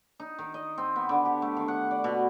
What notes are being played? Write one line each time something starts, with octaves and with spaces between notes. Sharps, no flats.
D#4
D#3
D#5
C4
B3
D3
G4
A3
D#3
F#5
D5
B2